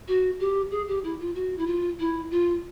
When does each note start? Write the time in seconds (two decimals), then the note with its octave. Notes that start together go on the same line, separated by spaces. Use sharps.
0.08 F#4
0.40 G4
0.71 G#4
0.88 G4
1.04 E4
1.20 F4
1.35 F#4
1.58 E4
1.67 F4
1.99 E4
2.31 F4